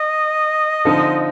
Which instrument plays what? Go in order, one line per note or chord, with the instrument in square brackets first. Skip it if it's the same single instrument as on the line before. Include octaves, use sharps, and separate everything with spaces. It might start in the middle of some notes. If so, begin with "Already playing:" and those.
Already playing: [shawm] D#5
[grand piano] D3 F3 C4 D#4